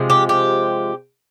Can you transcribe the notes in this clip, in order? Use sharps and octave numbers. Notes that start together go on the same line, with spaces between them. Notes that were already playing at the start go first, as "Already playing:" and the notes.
Already playing: C3 F3 G#3
G4
G4